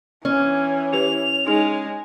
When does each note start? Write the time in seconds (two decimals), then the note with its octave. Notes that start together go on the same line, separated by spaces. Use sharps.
0.25 E3 C#4
0.93 E4 G4 B4 F7
1.47 G#3 D#4 G#4